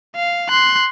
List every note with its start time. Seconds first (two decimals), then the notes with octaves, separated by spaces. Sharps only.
0.16 F5
0.49 C6 F#6